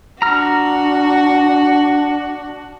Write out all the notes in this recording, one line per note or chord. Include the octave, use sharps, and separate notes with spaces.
D4 F#4 A#5 F6